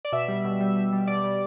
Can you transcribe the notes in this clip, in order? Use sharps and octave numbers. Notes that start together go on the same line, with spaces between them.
D5
B2 E5
G3
B2
G3
B2
G3
B2 D5
G3